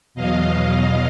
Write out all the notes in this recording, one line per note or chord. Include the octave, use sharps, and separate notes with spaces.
E2 B2 F#3 D#5 F5